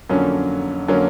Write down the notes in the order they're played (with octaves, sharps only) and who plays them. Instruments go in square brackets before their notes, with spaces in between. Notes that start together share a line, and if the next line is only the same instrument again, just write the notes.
[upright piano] F2 D3 F#3 A#3 C#4
D3 F#3 A#3 C#4